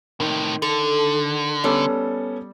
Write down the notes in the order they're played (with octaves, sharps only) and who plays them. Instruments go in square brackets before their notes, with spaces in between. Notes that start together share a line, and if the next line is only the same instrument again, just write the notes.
[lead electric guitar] A2 C3 [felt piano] D#3
[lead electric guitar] D3 [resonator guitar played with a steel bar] A4
[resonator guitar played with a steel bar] G3 [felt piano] B3 C#4 A4